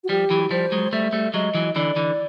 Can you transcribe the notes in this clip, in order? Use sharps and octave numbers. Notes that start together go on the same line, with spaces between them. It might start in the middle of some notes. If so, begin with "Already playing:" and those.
F#4
F3 G3 G4
E3 F#3
F3 G3 C5
F#3 G#3
G3 A3 E5
G3 A3
F#3 G#3 D#5
E3 F#3
D3 E3 D5
D3 E3